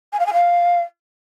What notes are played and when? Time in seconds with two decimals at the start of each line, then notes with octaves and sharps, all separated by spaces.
0.12 G#5
0.19 F5
0.26 G#5
0.33 F5